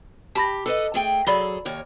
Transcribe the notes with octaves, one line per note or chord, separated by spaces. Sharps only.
G4 A5 B5 A#6
A4 B4 D#5
A3 G#4 G5
F#3 G#4 A4 D5 B5 G7
D#2 A#4 C#5